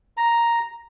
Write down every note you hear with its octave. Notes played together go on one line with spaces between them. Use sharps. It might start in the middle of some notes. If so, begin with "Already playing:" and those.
A#5